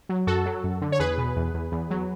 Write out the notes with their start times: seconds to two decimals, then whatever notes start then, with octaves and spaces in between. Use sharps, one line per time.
0.09 F#3
0.27 F#2 F#4 A4
0.46 F#3
0.64 F#2
0.81 D3
0.92 C#5
0.99 E2 G#4 B4
1.18 B2
1.36 E2
1.54 E2
1.72 E2
1.90 F#3